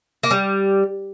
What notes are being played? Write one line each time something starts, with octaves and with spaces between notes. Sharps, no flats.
A#3
G3